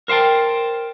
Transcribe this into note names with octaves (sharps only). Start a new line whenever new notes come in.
A#4 C5 F5 G5 A5